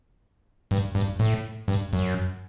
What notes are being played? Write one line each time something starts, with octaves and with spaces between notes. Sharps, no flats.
G2
G2
A2
G2
F#2